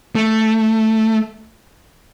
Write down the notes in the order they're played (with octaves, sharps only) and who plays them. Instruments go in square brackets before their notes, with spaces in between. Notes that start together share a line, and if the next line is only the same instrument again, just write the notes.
[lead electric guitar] A3